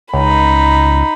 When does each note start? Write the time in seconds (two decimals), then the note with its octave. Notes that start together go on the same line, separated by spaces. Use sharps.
0.13 C#2 D#4 B5